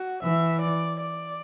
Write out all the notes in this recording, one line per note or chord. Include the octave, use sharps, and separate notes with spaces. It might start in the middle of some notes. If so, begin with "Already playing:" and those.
Already playing: F#4
E3 E5
D5
D5